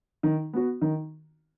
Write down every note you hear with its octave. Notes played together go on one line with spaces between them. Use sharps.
D#3
B3 F#4
D#3